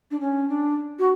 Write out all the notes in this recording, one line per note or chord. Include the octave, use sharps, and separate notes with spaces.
D4
C#4
D4
F#4